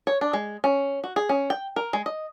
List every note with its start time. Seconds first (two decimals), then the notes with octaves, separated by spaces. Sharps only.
0.07 C#5
0.21 D4
0.33 G#3
0.64 C#4
1.04 F#4
1.16 G#4
1.29 C#4
1.50 G5
1.76 A#4
1.93 G#3
2.06 D#5